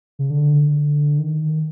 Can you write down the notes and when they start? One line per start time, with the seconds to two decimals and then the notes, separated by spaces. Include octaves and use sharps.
0.19 C#3
0.30 D3
1.19 D#3